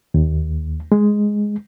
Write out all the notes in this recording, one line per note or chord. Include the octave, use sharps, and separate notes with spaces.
D#2
G#3